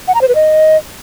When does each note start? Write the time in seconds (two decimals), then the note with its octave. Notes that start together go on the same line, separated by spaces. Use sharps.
0.08 F#5
0.15 A#5
0.21 C5
0.28 B4
0.35 D#5